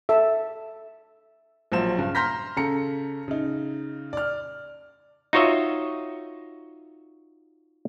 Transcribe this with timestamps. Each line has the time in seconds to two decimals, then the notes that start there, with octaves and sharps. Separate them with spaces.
0.09 A4 E5
1.72 A#1 F3 F#3 C5 E7
1.98 G2 C#3
2.15 A#5 C6 F6 G6 A#6 B6
2.57 C#3 A4 A#5 C#7
3.28 C#3 D#4
4.13 D5 F6
5.33 D#4 F4 F#4 C#5 D#5 E5